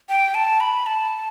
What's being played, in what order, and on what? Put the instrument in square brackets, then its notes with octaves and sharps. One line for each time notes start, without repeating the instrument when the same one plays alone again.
[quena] G5
A5
B5
A5